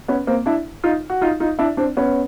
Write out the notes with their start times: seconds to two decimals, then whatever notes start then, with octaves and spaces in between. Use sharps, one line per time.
0.08 B3 C#4
0.27 A#3 C4
0.46 D4 E4
0.84 D#4 F4
1.10 F#4
1.21 D#4 F4
1.40 D#4 F4
1.59 D4 E4
1.77 C4 D4
1.97 B3 C#4